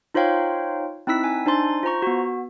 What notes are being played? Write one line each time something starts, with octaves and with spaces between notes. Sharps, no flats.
D#4 F4 C5 C#5 F5 G5
C4 D#4 E4 E6 B6
G#5
D4 D#4 C5 G#5 C6 A6
F4 C5 A#5 C#6
B3 F#4